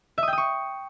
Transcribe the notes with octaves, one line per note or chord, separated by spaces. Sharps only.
E5
D#6
G5
D#6
C#6